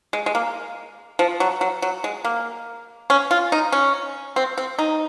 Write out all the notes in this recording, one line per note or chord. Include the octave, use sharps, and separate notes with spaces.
G#3
G#3
A#3
F3
F#3
F#3
F#3
G#3
A#3
C#4
F4
D#4
C#4
C4
C4
D#4